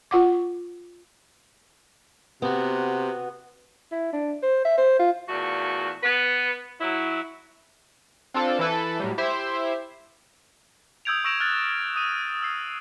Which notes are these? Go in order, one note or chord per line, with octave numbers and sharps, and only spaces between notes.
F4 F#5 D6
C3 B3 F#4
E4
D4
C5
E5
C5
F4
E2 A#2 A3 F#4
B3 B4
F#3 E4
C4 D4 F4 A4
E3 E4 A4 B4
A2 F#3 G3
E4 G4 C5 E5
D#6 E6 G6 G#6 D7 F7
C#6 E6 A#6 D7 E7 F7
F6 F#6 A6
D#6 D#7
E6 C7